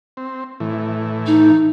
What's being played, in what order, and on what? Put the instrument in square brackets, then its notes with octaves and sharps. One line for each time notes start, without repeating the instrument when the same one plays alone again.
[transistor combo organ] C4
A2 E3
[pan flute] D#4